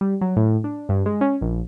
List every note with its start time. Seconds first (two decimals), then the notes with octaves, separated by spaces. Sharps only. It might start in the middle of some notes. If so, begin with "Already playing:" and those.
0.01 G3
0.21 F#3
0.37 A2
0.64 D4
0.89 G2
1.06 G#3
1.21 C#4
1.41 A#1